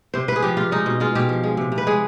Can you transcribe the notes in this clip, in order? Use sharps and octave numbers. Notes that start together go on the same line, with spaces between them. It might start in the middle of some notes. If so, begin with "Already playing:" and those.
C3 C5
C3 B4
G#4
F3 G4
C3 F4
G#3 D#4
B2
G#3 F4
B2 G4
F3
G#3
C3
C3
B4
G#3 G#4